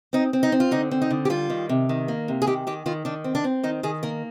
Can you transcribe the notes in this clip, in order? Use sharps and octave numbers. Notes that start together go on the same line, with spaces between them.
C4 D#4
C4
D#4
C4
F4
D3 D#4
C4
D#4
D3
G4
G3 F4
D#3
C3
D#3
A#3
C3
G#4
D#3 G4
D#3 G4
D#3 F4
D#3 D4
C4
D4
C4
D#3 D#4
D#3 G#4
A#3 A#4